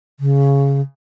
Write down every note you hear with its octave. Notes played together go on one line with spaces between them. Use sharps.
C#3